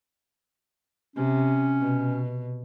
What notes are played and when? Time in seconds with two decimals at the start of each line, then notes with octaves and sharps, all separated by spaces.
1.16 C3 C#4
1.80 B2